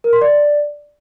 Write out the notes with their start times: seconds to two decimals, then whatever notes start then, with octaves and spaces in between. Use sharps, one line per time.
0.04 A#4
0.13 C6
0.21 D5